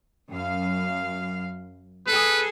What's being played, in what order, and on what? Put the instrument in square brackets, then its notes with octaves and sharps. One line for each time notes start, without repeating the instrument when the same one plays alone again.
[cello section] F#2 F5
[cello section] G#4 A4 [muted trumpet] B4